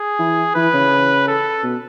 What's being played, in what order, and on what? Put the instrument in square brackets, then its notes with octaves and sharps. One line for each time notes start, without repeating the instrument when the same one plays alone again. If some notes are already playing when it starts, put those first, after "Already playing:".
Already playing: [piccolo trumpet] G#4
[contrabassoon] E3
[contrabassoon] E3 [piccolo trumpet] B4
[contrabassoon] C#3
[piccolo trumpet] A4
[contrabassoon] B2